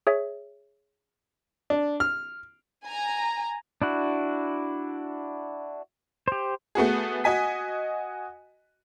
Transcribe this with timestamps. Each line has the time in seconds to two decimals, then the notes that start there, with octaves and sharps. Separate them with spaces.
0.07 G#4 C#5 E5
1.70 D4
2.00 F6
2.84 G#5 A#5
3.82 D4 E4 F#4
6.28 G4 C5
6.75 A3 B3 F#4 G#4
7.24 F#4 D#5 G#5 B6